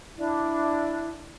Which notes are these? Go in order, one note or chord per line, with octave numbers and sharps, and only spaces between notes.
D4 E4